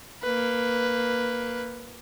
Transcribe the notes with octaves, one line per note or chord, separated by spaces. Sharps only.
A#3 B4